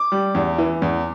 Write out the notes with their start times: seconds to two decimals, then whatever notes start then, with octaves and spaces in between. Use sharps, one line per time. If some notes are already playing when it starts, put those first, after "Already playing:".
Already playing: D6
0.12 G3
0.35 E2
0.58 E3
0.82 E2